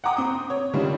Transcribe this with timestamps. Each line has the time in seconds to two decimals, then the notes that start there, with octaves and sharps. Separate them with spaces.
0.04 F#5 G5 A#5 D6 D#6
0.17 C4 D#6
0.50 C#5
0.73 D3 D#3 G3 C#4 F4